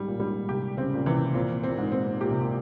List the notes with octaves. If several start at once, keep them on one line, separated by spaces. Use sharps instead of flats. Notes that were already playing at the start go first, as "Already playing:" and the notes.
Already playing: G#2 G3
A#2
G#2 G3
C3 G4
C#3 C4
A#2
C3 E3
A#2 C4
C4
A#2
G#2
C4
A#2 G4
C3
A#2